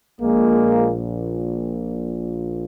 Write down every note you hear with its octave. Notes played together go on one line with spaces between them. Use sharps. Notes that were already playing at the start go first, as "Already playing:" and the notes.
A#1 A#2 G#3 A#3